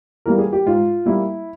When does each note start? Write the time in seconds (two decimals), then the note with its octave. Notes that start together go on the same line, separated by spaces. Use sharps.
0.26 E3 G3 A#3 A#4
0.38 G#4
0.53 G4
0.66 G#2 F4
1.06 G3 A#3 E4